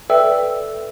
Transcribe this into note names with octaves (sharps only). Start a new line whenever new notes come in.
A4 B4 D5 E5 G5 E6